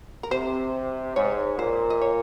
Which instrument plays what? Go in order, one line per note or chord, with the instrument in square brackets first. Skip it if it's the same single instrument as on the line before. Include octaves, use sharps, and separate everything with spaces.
[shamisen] A#4
[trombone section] C3 [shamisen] C5
[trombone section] G#2 [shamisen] C#5
[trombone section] A#2 [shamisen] C5
[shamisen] D#5
C#5